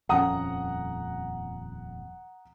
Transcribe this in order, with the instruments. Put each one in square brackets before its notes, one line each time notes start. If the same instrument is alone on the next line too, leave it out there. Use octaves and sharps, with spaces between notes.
[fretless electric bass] D#1 F2 C#4 [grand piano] F#5 A#5 D#6